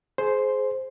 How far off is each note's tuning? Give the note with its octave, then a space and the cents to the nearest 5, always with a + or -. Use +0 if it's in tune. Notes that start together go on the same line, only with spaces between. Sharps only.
G#4 +25 C5 +0